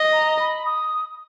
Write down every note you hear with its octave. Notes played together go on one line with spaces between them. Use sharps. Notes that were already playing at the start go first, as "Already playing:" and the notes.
Already playing: D#5
A#5
B5
D#6